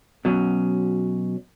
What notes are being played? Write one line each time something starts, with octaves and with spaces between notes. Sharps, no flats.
B2 F#3 C#4